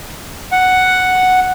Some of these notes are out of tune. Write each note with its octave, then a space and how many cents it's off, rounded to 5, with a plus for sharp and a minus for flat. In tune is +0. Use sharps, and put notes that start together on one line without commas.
F#5 +0